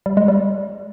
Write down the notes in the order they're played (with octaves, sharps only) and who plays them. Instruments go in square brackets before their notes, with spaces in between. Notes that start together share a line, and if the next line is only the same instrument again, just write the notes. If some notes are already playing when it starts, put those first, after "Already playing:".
[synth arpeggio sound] G3
G#3
G3